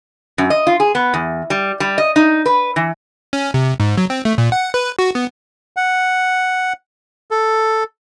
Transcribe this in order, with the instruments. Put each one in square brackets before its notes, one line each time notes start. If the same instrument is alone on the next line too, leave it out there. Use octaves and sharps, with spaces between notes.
[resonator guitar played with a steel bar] F#2
D#5
F4
G#4
B3
E2
G3
G3
D#5
D#4
B4
E3
[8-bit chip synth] C#4
C3
G#2
F#3
C4
A3
A#2
F#5
B4
F#4
B3
[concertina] F#5
A4